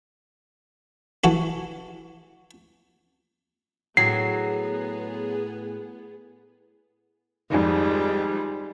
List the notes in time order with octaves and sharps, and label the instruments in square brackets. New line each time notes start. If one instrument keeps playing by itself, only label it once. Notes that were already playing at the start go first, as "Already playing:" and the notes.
[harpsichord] E3 F#4 A4
[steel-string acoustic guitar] A2 [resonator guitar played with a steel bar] F#3 [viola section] B3 G#4 [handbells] C7
[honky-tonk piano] F2 G#2 D#3 [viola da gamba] G3 G#3